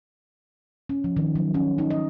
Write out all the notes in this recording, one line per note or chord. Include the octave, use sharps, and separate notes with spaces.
C#4
F3
D#3
F#3
C#4
D#4
D#5